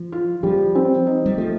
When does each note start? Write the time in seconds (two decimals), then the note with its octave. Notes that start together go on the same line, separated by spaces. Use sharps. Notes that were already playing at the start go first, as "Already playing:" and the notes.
Already playing: F3
0.12 F4
0.43 F3 G3
0.75 C4
1.07 D#4
1.26 G3
1.37 F3 A3